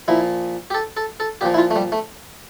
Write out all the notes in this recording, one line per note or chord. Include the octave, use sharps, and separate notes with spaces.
A#2 F3 E4
G4
A4
A4
A4
A#2 F3 G4
E4
F4
A3
G3
A3